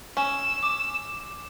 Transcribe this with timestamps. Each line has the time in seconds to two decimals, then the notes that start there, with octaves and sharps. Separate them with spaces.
0.17 C#4 E6
0.63 D6